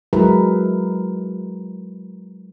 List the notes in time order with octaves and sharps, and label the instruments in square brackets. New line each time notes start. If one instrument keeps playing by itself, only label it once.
[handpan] F#3 G#3 E4 G#4 A#4 B4